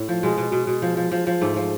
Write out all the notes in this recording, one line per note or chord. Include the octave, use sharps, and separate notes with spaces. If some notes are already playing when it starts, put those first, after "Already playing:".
Already playing: A2
F3
B2 G#3
B2
B2
B2
F3
F3
F3
F3
G#2 A3
F3